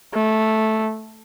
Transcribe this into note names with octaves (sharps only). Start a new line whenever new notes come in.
A3